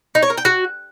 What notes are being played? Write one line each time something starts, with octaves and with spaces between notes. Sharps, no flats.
D#4
C#5
A#4
G5
F#4